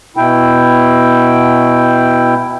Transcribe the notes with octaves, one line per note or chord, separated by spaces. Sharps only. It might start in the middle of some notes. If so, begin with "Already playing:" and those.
B2 E4 G5